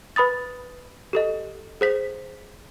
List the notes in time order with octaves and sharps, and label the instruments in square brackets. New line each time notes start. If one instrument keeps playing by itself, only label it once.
[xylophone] B4 B5 D#6 A6
G4 A4 D#5
G#4 C5 B6